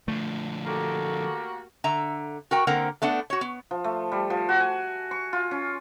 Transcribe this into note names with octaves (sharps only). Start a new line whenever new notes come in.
D3 F3 A3
A#3 F#4 G4 A4
D3 E5 A#5
F#4 A#4 G5
D3 A#3 C4 A#4 F#5
A3 B3 D4 F#5
F#4 C#5
B3
F3
A3
G3
F3
F#4
G#5
C#6
F4
C#4